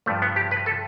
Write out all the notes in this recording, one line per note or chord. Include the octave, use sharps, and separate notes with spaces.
G2 F3 A3
B3
G4
B4
A4